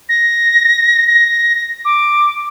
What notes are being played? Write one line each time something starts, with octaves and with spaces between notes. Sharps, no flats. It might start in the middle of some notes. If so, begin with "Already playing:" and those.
A#6
A#6
D6